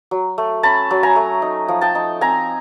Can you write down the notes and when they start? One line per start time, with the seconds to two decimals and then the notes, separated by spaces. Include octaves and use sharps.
0.11 F#3
0.38 A3
0.63 C#4 A5 B5
0.91 F#3
1.03 G#5 A#5
1.16 A3
1.42 D#4
1.68 F3
1.81 G5 A5
1.95 D#4
2.21 C4 G#5 A#5